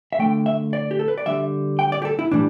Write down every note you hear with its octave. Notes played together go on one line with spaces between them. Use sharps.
E5
D3 A3 G5
E5
D5
G4
A4
B4
D5
D3 G3 E5
G5
D5
G4
A4
E4
A2 E3 G3 D4